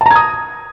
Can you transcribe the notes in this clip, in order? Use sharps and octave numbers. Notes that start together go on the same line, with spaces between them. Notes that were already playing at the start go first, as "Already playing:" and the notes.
A5 A#5 D#6 G#6